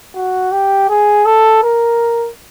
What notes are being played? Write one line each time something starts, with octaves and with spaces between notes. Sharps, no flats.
F#4
G4
G#4
A4
A#4